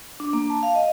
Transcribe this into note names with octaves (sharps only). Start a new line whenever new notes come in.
D4
A#3
A5
F5
D#5